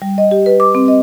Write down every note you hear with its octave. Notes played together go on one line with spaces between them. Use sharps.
G3
D#5
G4
B4
D6
C4
D#5